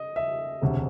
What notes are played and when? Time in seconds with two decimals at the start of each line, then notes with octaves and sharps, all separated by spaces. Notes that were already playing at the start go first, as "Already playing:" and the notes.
Already playing: D#5
0.16 E5
0.62 E1 D2 C3